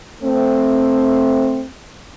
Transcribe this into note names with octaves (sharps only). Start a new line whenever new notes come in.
A3 C4